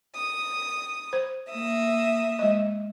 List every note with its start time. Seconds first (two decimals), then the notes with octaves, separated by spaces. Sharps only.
0.15 D#6
1.13 C5
1.49 A#3 E5 D#6
2.39 G#3 D#5